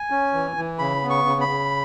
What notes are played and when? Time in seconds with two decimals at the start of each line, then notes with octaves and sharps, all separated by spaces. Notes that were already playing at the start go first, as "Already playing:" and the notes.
Already playing: G#5
0.10 C#4
0.33 E3
0.56 E3
0.79 C#3 B5
1.03 B3
1.10 C#6
1.25 C#3
1.41 B5
1.49 C#3